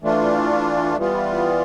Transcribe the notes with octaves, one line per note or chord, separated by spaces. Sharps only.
E3 A3 D4 F4
E3 G3 B3 F4